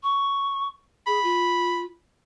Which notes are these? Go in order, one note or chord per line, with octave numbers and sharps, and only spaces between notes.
C#6
G#4 B5
F4